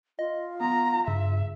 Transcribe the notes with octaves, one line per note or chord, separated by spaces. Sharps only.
F4 D#5
B3 A#5
G2 C#3 E5